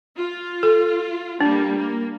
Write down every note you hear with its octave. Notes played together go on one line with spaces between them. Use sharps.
F4
A4
G3 A#3 D4
A#3